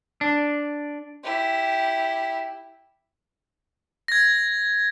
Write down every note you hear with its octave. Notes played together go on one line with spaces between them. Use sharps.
D4
E4 G4
G#6 A#6